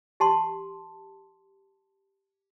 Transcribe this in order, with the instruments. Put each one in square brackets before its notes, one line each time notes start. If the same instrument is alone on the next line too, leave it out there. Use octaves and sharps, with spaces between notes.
[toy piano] G4 A5 C6